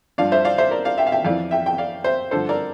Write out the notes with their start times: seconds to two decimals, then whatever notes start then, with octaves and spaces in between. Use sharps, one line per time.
0.18 G2 F3 D5 F5
0.32 C5 E5
0.45 D5 F5
0.58 C5 E5
0.71 A#4 D5
0.85 D5 F5
0.98 E5 G5
1.07 F5
1.12 E5 G5
1.25 F2 E3 D5 F5
1.51 E5 G5
1.66 G5
1.78 D5 F5
2.04 C5 E5
2.31 G2 D3 F3 A4 C5
2.49 A#4 D5